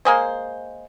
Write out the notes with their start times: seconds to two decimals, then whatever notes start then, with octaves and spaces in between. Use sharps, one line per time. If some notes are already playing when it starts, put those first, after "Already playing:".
0.05 G#3 A#3 G#4 C5